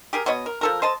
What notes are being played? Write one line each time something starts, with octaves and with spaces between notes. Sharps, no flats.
G4 G#4 A#4
B2 B3 C#5 D#5
A#4
F3 A4 A#4
C5 D#5 A5